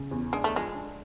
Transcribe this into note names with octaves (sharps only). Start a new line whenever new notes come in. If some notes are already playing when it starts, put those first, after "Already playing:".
Already playing: C#3
E2
G#3 D4
A3
F3 G#3
D4